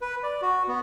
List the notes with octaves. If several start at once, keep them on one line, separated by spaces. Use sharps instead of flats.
B4
D5
F#4
B3